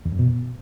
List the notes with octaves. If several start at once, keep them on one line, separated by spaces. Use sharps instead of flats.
E2
F#2
B2